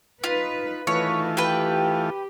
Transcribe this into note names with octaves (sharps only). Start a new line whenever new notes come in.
D#4 F4 B4
D#3 E3 A3 F4 B4 C#5 D#5
G4 B4 G5